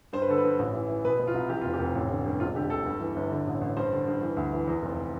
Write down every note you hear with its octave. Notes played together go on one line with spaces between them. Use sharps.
G2 C5
B4
D3 A4
B4
G2
A1
E3
E3
B2 B4
B2
F4
C2
E3 G4
F1 F4
G4
F1
A1
D3
G2
E1 F4
D3 G4
D2 A4
G2
E3
G1
D3
A1
A1
G2 C5
D3
G2
E3
D2
E3
E2
F1